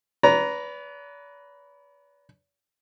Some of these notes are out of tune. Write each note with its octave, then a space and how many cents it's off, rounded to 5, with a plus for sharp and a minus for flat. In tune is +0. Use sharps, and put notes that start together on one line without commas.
B4 +5 D5 -45 A#5 +5